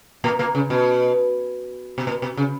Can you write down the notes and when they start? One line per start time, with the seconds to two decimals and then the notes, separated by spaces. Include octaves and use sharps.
0.24 A#2 A#3
0.39 A#2 A#3
0.55 C#3
0.70 B2
1.98 B2
2.07 A#2
2.22 B2
2.37 C#3